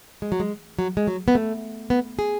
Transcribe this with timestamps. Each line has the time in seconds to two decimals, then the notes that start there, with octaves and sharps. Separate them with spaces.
0.22 G#3
0.32 F#3
0.40 G#3
0.79 F#3
0.97 G#3
1.07 F#3
1.28 B3
1.35 A3
1.90 B3
2.19 G#4